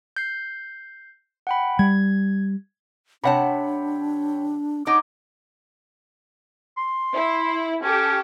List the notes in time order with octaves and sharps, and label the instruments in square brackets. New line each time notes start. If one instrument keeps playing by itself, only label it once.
[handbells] G6 C7
F#5 G5 B5
[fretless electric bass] G3 [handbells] G#6
[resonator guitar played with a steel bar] C3 F#5 A5 [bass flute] D4 [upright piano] C#5 G5 B5
[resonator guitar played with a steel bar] D#4 C#5 [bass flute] F#5 [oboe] D6
[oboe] C6
[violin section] E4
[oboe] C#4 [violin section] G4 A4